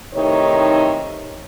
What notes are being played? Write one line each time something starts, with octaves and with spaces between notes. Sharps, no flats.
A2 C3 D#3 D#4 C#5